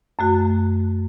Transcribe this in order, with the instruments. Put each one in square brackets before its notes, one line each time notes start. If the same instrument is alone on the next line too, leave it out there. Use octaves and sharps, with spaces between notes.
[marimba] F#2 A3 F#4